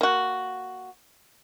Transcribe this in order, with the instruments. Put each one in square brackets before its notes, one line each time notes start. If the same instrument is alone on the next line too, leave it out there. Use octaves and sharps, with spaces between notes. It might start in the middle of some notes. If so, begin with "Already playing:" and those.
[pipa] A#3 F#4